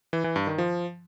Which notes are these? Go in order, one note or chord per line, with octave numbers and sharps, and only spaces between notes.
E3
E3
G2
D#3
F3